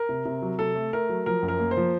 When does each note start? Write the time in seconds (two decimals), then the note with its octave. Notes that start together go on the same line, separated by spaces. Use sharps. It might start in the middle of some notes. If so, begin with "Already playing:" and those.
Already playing: A#4
0.09 C3
0.25 C3
0.42 F#3
0.59 C3 A4
0.75 A3
0.93 A3 A#4
1.09 F#3
1.26 F3 A#4
1.42 F#2
1.48 A#4
1.59 A#3
1.71 C5
1.77 F3